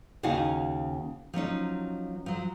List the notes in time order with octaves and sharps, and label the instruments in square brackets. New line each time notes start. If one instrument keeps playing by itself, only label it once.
[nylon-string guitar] D#2 C#3 C#4 D#4 F#4 F5
F3 F#3 C#4 D#4
F3 F#3